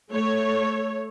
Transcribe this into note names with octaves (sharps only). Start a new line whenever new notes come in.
A3 A4 C#5